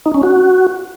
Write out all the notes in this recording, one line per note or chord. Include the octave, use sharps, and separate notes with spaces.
D#4
C#4
F#4